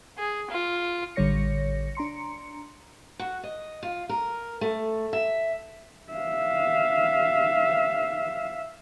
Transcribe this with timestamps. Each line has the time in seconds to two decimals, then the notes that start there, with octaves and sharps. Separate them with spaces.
0.18 G#4
0.50 F4
1.16 A1 D3 G3 C#5 A#6 C#7
1.95 D4 A#5 C6 C#7
3.19 F#4
3.43 D#5
3.83 F4
4.09 A#4
4.61 A3
5.13 E5
6.13 E5 F5